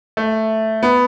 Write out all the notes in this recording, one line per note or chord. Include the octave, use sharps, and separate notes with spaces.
A3
B3